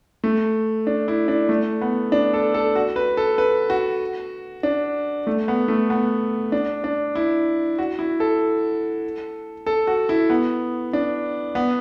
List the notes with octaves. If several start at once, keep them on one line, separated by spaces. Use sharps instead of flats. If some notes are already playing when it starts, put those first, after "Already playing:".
A3
D4
E4
D4
A3
B3
D4
A4
A4
F#4
B4
A4
B4
F#4
D4
A3
B3
A3
B3
D4
D4
E4
F#4
E4
A4
A4
F#4
E4
B3
D4
B3